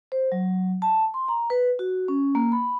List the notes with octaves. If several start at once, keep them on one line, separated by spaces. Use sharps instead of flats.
C5
F#3
A5
C6
A#5
B4
F#4
C#4
A#3
B5